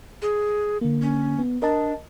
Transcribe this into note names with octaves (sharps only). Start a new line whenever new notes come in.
G#4
D3 A#3
C#4
B3
D4 A#4 D#5 A5